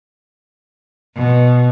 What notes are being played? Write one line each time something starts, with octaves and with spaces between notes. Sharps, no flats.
B2